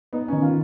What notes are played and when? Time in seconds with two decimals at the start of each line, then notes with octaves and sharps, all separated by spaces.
0.13 B3 D#4
0.28 D#3 C#4
0.42 F4